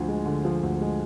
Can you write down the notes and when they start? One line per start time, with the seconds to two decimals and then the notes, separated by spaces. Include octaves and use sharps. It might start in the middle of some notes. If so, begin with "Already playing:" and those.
Already playing: D2 D3 F3
0.08 G#3
0.25 D3
0.45 F3
0.63 D2
0.81 G#3